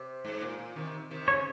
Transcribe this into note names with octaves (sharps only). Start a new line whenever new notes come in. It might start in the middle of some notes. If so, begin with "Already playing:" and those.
Already playing: C3
G#2
A#2
A#2
C3 D#3
C3 D#3
C#3 C#5